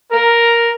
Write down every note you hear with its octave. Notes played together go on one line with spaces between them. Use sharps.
A#4